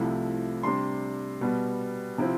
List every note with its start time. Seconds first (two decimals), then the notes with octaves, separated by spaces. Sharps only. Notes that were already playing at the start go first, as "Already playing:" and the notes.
Already playing: C2 C3 F3 A3 E4
0.63 C3 G3 D4 C6
1.41 B2 G3 B3
2.18 C3 F3 C4 E4